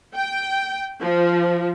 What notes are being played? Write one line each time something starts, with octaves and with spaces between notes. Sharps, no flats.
G5
F3